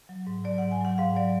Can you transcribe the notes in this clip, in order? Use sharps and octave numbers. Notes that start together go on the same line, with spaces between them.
F#3
G#2
F#3 D5
G#2 F#5
G#5
F#3 F#5
G#2 F5
F#3 D5